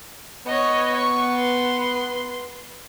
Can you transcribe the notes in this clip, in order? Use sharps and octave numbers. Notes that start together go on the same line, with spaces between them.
B3 C#5 D#5
C#6
B4 C6